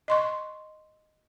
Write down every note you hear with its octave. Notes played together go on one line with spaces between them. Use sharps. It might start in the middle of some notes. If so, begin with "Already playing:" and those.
D#5 C6 C#6